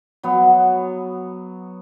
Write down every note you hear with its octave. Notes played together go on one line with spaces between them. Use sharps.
F#3 B3